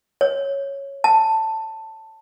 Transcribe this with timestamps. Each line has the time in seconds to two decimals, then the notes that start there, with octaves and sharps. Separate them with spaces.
0.21 C#5
1.04 A5